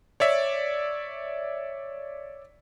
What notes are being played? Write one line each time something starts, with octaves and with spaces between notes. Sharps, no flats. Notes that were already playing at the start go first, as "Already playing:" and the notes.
C#5 D5 E5